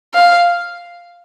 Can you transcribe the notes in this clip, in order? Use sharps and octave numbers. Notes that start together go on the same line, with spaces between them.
F5